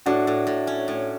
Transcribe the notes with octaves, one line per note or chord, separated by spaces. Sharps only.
A2 D4 F#4
A2
A2
C#4
A2